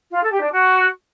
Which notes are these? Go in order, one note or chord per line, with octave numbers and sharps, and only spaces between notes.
F4
A4
G4
D4
F#4